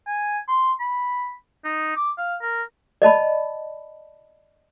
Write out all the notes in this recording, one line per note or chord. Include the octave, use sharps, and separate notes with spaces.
G#5
C6
B5
D#4
D6
F5
A#4
D5 D#5 A5 B5